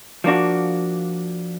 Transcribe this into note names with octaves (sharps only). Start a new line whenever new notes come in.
F3 A#3 D4 F#4